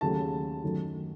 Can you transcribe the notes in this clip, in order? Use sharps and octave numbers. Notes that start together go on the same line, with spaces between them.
D#2 C#3 F#3 A3 A5
F#2 D#3 F#3 A3